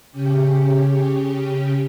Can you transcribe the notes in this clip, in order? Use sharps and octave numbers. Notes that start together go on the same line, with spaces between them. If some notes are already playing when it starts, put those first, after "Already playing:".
C#3 C#4 G4